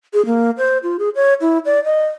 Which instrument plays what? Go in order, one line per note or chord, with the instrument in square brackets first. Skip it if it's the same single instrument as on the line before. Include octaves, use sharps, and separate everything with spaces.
[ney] G#4
A#3
C5
F4
G#4
C#5
E4
D5
D#5